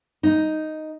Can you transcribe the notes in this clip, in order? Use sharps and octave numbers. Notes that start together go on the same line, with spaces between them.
D#4